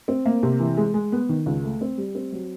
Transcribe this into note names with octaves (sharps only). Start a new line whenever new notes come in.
C4
A#3
C3
E3
G#3
G#3
B3
D#3
C#2
A3
C4
G3
C4
F#3